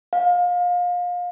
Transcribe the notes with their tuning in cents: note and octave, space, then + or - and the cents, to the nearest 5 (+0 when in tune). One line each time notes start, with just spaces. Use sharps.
F5 +30